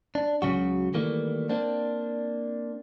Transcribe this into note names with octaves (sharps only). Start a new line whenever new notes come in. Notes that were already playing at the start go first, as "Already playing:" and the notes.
D4
C#2 C#3 F#3 F#4
D#3 E3 G3 A3 A#3
A#3 C4 D4